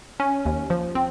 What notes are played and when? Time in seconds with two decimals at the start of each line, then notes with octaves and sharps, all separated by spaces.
0.20 C#4
0.45 D#2
0.70 F3
0.95 C4